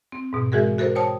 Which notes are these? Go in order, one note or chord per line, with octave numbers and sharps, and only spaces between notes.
C4
G#2 B2
E3 G#3 F#4 G#4 A#4
F#4 A4 A#4 C5
C5 C#5 G5 A5 D#6